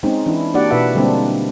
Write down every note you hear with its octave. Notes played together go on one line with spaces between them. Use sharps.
G#3 C4 C#4 D#4
E3 D4 E4
A#3 D4 F#4 G4 D5 F#5
B2 E4 B4 E5 F#5
D3 G3 G#3 A#3 C4 D4